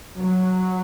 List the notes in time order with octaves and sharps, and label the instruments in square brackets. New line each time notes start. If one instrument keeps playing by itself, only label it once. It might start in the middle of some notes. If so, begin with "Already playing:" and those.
[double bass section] F#3